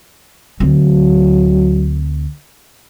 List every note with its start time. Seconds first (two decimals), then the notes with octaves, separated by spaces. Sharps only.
0.60 D2 F#3 C4